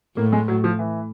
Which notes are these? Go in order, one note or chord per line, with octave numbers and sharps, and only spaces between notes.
A2 A#3
G#3
F#3
F3
E3